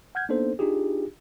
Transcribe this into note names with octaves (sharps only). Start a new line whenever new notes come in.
F#5 F6 G6 G#6
A#3 B3 D4 D#4 A4 C5
D4 D#4 F4 G4 G#4